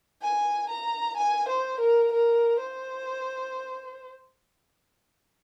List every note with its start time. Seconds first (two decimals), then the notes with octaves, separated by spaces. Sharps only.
0.22 G#5
0.70 A#5
1.17 G#5
1.49 C5
1.80 A#4
2.13 A#4
2.60 C5